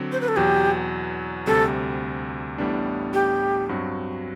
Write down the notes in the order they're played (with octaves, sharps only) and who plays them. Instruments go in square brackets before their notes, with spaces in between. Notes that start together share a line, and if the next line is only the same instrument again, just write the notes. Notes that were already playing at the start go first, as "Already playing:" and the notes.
Already playing: [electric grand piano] D3 F#3 C4
[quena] C5
B4
A4
[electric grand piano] E2 B2 F#3 [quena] G4
[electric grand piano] D2 C3 G3 [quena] A4
[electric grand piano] A1 A2 G3 B3 D4
[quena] G4
[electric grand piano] G2 F#3 C4 F#4